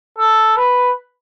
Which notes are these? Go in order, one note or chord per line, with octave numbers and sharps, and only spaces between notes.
A4
B4